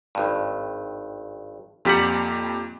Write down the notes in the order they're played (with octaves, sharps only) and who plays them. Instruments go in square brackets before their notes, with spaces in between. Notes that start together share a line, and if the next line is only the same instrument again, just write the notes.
[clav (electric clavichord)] G#1 G2
[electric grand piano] F2 G4 B6 [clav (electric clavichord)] A#2 G3 F#5 [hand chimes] A#3